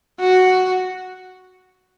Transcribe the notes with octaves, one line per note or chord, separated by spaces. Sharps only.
F#4